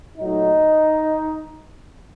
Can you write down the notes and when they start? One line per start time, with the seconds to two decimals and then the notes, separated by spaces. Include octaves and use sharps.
0.18 A#2 F#3 A3 D#4